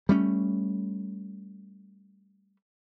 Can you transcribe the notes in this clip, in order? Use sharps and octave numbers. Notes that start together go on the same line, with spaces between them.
G3 A3 C#4